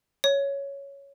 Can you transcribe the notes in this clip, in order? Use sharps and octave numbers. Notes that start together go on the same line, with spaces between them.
C#5